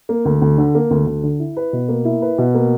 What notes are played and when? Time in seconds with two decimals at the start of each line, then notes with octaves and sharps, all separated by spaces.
0.09 A#3
0.25 D2
0.42 D2
0.58 D3
0.75 A#3
0.91 D2
1.07 D2
1.23 D3
1.39 E4
1.57 B4
1.73 B2
1.89 A#3
2.05 E4
2.22 B4
2.38 B2
2.55 A#3